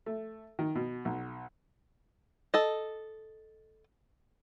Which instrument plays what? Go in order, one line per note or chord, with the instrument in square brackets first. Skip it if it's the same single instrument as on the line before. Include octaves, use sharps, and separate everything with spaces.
[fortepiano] A3
D#3
B2
B1
[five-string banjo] A4 D#5